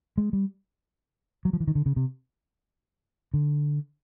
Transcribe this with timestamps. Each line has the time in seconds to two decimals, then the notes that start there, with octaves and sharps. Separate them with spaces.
0.18 G#3
0.33 G3
1.45 F#3
1.53 F3
1.60 E3
1.67 D#3
1.75 D3
1.86 C#3
1.96 C3
3.34 D3